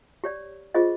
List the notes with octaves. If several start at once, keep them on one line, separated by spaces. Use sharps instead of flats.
G4 C#5 D5
F4 G4 G#4 C5 D#5